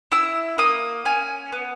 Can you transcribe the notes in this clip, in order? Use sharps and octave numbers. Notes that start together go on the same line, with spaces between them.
E4 E6
A#3 D#6
C#4 G#5
B3